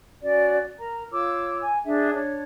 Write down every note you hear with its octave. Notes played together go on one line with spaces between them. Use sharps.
C#4 F#4 D5
A#4 A#5
F4 C#5 D6 E6
G#5
D4 G#4 E5
D4 C#5